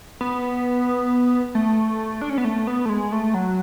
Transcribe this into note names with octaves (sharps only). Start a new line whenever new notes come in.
B3
A3
D4
C#4
B3
A3
B3
A3
G#3
A3
F#3